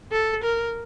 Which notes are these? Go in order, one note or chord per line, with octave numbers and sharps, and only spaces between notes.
A4
A#4